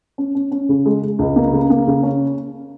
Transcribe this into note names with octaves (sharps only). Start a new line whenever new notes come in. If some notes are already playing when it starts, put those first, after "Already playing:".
C#4
C#4
C#4
C#3
G#3
G#3
C#2
A#3
C#3
A#3
C#3
C#4